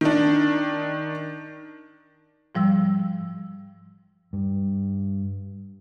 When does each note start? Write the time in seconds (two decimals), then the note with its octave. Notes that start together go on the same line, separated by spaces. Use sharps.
0.01 D#3 D4
2.55 G#2 F3 G3 E6
4.33 G2